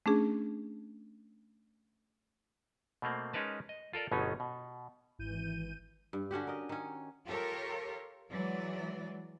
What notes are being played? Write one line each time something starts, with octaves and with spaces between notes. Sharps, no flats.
A3 C#4 D4 G#4
B2 A3 A#3 C4
G#3 C#4 D#4 A#4 B4 A5
D#5
F4 A4 A#4 D5
G1 B2 F#3 B3 C#4 D#4
B2
G#1 E3 G6 D#7
G2
D3 C#4 F#4 G4
A#4 D#5
D#3 C#4
F4 G4 A4 A#4 C#5
E3 F#3 G#3 D5